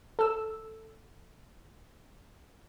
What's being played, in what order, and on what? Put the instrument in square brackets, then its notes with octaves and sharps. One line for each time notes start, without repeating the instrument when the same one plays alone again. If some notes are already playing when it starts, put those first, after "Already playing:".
[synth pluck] A4 E6